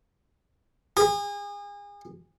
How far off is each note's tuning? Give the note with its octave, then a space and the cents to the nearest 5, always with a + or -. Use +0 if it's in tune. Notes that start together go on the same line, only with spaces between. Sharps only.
G#4 -35